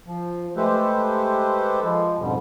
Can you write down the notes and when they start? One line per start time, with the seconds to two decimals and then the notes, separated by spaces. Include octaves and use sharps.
0.06 F3
0.56 G#3 A3 G4 A4 B4 C5
1.83 F3 G#3
2.19 F2 G#2 B2 D3 G3